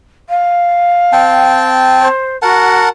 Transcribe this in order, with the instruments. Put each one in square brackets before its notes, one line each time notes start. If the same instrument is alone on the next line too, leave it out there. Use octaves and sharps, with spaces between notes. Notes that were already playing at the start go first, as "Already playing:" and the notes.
[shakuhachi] F5
[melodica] C4 G5 A5
[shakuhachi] C5
[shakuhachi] F#4 [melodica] A#4 F#5 A5